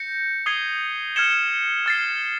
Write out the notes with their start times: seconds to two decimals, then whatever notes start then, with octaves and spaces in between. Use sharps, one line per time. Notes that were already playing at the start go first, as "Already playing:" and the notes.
Already playing: G6 A#6 C#7
0.46 D#6 G#6 C7 D#7 G7
1.16 F6 G#6 C#7 E7 G7
1.86 F6 A6 C7